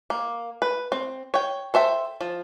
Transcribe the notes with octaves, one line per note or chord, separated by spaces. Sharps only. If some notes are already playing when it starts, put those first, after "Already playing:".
A#3
B4
C4
C#5 G5
A4 C5 E5 G5
F3